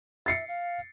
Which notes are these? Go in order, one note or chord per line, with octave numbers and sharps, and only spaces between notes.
E5 A6 C7 C#7
F5